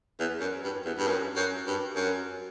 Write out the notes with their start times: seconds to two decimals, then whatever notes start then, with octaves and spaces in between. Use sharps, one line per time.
0.19 E2
0.40 F#2
0.64 G2
0.85 E2
0.98 G2
1.08 F#2
1.36 F#2
1.67 G2
1.96 F#2